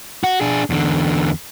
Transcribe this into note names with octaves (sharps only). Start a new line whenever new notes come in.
F#4
D4 G#4
E2 D3